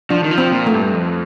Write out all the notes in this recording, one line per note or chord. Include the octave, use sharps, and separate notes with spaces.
F3 D4
D#3
F3
C4
A#2
A3
G2
F2